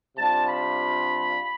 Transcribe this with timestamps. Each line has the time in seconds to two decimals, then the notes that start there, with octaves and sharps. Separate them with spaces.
0.17 C3 G3 D4 F4 A5
0.47 B5